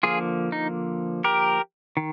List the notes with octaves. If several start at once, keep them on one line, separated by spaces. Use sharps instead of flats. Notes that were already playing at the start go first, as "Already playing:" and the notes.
D3 F3 A#3 F4 G#4
D#4
G4 A#4
D#3